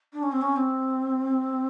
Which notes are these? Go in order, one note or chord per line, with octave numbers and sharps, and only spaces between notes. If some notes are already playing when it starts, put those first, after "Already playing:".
D4
C#4
C4
C#4
C4